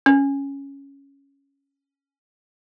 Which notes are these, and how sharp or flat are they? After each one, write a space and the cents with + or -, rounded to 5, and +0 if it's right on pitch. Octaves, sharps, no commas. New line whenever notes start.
C#4 +0